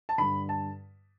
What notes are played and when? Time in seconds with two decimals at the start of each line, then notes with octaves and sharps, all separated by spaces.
0.09 A5
0.18 G2 D3 B5
0.49 A5